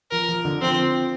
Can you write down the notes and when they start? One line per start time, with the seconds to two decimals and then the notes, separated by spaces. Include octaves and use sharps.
0.11 F3 A#4
0.28 F3
0.45 D3
0.61 F3 C4